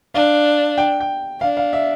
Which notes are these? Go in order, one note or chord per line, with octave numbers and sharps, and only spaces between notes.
D4 F5
G5
G5
D4 F5
F5
E5